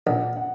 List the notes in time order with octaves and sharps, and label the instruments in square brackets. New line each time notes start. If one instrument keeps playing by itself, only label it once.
[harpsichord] A#1 [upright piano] F#5
[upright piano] F#5